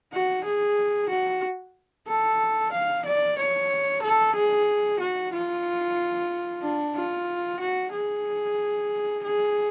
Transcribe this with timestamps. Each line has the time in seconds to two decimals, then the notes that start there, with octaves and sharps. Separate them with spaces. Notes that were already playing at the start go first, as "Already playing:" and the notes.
0.13 F#4
0.44 G#4
1.09 F#4
2.07 A4
2.72 F5
3.06 D5
3.38 C#5
4.02 A4
4.35 G#4
5.00 F#4
5.33 F4
6.62 D4
6.95 F4
7.60 F#4
7.92 G#4
9.23 G#4